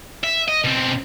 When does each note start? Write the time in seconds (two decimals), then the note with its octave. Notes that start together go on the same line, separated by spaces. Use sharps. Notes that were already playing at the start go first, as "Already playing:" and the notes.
0.24 E5
0.49 D#5
0.64 B2 C4